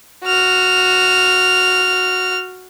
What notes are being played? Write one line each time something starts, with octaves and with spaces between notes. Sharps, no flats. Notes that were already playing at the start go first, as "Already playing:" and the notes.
F#4 F6